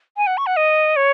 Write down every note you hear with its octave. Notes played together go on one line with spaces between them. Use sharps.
G#5
F#5
C#6
F#5
D#5
C#5